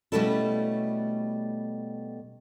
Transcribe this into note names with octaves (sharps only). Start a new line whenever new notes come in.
B2 G3 A3 C#4 E4 A4